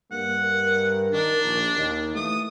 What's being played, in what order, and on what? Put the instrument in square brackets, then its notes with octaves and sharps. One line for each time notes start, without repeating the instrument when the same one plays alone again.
[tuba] G2 [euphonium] A#3 [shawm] F#5
[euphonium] A#4
[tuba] D#3 [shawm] D4
[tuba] A#1
[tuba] D#2 [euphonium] D#3
[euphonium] E3 [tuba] A3 [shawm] D#6